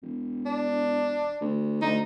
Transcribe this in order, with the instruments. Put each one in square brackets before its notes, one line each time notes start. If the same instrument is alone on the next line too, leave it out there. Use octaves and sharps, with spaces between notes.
[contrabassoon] E1
[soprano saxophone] D4
[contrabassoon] D2
[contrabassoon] D2 [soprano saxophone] D#4